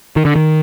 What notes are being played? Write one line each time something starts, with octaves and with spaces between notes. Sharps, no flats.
D#3
D3
D#3